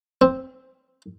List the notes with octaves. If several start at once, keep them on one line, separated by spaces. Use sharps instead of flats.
C4